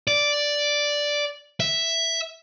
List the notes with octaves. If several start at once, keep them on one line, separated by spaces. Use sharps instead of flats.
D5
E5